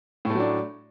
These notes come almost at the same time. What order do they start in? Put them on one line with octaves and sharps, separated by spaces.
A2 A3 F#3 D4